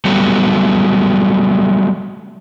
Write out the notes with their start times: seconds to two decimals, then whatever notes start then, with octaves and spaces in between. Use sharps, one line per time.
0.05 F#3 G3 A3 B3